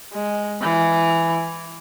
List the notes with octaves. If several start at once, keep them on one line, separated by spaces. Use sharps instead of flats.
G#3
E3